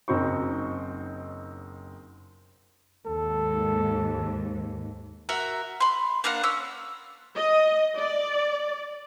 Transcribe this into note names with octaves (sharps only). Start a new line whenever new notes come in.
F#1 B1 C4 D#4 C5 C#6
D#2 G#2 A4
F#4 A#4 E5
B5 C6
A#3 D4 F5 F#5
C#4 E6
D#5
D5